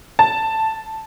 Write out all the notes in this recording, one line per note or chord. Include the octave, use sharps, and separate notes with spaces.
A5